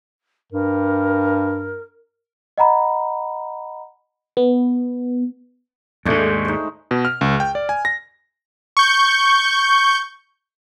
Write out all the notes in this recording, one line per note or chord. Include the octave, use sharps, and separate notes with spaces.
G2 A#4
D#5 F#5 A#5 B5
B3
D#2 G#2 G#3 A3 D4
D#4 C5
B2
F6
C#2
G5
D5
G#5
A#6
C#6 G6